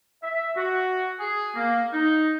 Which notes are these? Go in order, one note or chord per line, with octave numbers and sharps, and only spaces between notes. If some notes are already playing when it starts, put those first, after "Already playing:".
E5
F#4
G#4
A#3
D#4